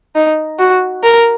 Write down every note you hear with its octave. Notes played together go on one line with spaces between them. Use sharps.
D#4
F#4
A#4